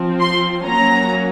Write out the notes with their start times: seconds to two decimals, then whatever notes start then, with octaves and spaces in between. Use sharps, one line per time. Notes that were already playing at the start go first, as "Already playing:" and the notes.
Already playing: F3 C4
0.20 C6
0.66 F#3 A#3 C#4 A#5